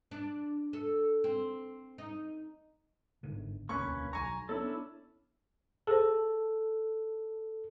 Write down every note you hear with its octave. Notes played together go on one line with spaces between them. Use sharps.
D4
A4
C4
D#4
G1 G#2 D3
E1 D2 A#3 C#4 B4 C#6
B1 F#3 G#5 A#5 C#6
B3 C#4 D4 E4 A4
G#4 A4 C5